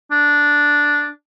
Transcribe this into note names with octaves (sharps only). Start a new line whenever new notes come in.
D4